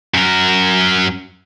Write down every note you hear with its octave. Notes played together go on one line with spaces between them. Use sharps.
F#2 A#4